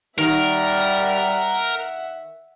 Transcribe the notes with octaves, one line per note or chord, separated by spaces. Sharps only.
D#3 G3 A#4 E5 F#5